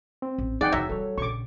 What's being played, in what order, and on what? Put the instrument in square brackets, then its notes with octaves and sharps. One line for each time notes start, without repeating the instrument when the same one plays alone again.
[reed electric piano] C4
[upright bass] A1
[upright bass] E3 [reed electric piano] D#4 [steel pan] G#4 F#5 G5 [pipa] D5
[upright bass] E2 C3 [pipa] F#3 [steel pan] E5
[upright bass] E3 G3 [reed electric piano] A4 C#5
[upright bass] A#1 C#3 [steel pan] C#6 D6